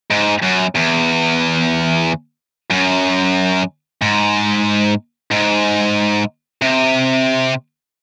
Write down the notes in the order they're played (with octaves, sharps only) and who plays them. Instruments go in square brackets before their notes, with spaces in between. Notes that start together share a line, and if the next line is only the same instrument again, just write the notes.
[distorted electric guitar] G#2
F#2
E2
F#2
G#2
G#2
C3